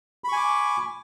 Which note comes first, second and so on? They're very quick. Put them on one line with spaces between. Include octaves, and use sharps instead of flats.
B5 C#6 G#5 D6